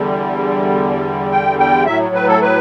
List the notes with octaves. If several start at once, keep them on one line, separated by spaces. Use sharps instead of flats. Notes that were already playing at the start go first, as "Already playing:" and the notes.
Already playing: E2 D3 G3
G5
G5
A2 F#3 E5
B4
A4
B4